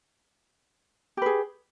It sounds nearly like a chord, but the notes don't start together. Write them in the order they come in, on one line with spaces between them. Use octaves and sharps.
G4 B4 G#4